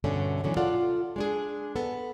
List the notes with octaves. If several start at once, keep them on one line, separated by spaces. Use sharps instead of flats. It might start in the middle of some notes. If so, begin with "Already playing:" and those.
G2 B2 D3 A3 C#4
B2 D3 E3 F#3 C#4 D4
F4 A4 D5 F5 F#5
G#3 D4 G#4
B3 A4